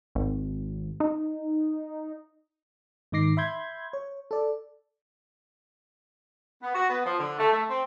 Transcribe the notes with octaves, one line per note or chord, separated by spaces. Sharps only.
G#1
D#4
G#2 D#3 D#4 D6 A#6 C7
E5 B5 C6 G6 G#6
C#5
A4 D5
B3
F#4
B3
F3
D3
A3
A3
C4